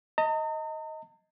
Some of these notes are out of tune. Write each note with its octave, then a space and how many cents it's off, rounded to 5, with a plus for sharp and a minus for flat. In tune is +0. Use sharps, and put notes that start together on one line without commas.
D#5 +15 A#5 -45